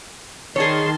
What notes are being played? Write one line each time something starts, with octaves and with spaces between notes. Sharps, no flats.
D#3 G#4 C#5 A5 C6